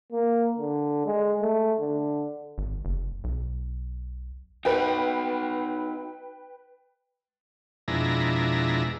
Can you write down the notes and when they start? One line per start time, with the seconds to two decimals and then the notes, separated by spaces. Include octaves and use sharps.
0.12 A#3
0.58 D3
1.06 G#3
1.41 A3
1.80 D3
2.58 G#1
2.85 F#1
3.24 B1
4.65 D#4 F#4 B4 G5
7.88 F2 B2 G#3 D4 E4 A#5